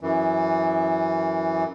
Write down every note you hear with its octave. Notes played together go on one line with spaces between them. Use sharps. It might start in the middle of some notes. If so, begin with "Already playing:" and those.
F#2 E3